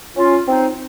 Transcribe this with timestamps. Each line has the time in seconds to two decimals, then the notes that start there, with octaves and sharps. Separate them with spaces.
0.15 C#4 F4
0.47 C4 D#4